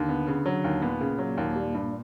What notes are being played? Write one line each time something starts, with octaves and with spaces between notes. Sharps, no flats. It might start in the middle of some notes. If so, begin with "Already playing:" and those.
Already playing: D#2 D3
B3
C#3
F#3
D#2
A#2 B3
C#3
F#3
D#2
G3
G2